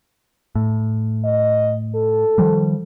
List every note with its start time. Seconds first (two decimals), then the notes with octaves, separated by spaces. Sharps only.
0.55 A2
1.24 D#5
1.95 A4
2.38 D#3 F3 G3